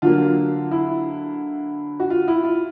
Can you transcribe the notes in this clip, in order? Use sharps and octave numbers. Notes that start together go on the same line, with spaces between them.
D3 F#3 A#3 F4
E4
F#4
F4
E4
F4